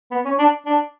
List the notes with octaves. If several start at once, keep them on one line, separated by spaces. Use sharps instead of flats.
B3
C#4
D4
D4